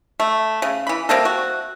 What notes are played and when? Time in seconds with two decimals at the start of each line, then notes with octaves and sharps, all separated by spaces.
0.20 A3
0.62 C#3
0.87 E3 B5
1.09 C3 G3 A#3 A4
1.25 F#4